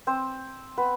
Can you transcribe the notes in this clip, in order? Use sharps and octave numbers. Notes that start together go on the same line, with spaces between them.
C4 C5
B3 B4